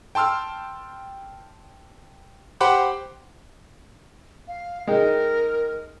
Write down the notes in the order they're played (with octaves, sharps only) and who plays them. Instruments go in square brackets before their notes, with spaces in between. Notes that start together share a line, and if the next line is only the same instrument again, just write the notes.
[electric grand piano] G5 A5 C6 E6 F6
G4 C5 F#5 B5 C6 D6
[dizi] F5
[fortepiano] G#3 D#4 G5 [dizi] A#4